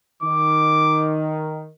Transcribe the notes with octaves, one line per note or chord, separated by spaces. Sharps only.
D#3 D6